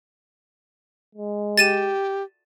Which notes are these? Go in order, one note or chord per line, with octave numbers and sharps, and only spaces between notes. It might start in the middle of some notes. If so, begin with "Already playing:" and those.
G#3
G4 A6 D#7 E7